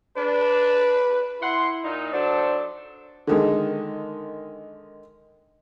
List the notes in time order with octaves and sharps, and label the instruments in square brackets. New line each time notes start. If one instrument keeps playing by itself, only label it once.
[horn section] D4 [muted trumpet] B4
[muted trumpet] E4 [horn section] F#5 C6
[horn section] A#2 D#4
[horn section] F#3 D4 A4 [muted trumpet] C5
[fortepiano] D3 D#3 G#3